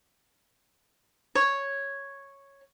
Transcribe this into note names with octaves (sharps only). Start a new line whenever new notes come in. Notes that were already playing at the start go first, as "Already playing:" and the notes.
C#5